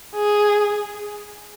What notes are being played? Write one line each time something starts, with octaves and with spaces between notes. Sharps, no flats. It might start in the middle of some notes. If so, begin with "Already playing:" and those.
G#4